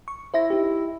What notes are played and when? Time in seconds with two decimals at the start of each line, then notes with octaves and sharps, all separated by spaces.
0.08 C#6
0.34 E4 C5 E5 A#6
0.50 D#4 G4